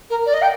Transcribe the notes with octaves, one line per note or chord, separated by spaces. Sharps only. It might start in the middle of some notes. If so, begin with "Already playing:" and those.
A#4
D5
D#5
G5